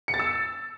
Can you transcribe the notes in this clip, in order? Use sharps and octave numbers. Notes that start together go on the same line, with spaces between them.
C#7
A6
E6